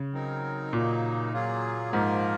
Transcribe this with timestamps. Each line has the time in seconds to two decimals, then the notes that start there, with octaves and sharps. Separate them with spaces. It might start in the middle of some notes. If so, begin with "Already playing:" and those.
Already playing: C#3
0.13 F#3 C4 D#4 A#4
0.73 A#2 C#3 F#3 A#3 D#4
1.33 F#3 A#3 F4 G#4
1.93 G#2 F3 A#3 F4 A#4